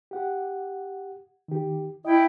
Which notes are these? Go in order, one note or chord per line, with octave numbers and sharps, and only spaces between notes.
G4 F#5
D#3 G4
E4 D#5 G5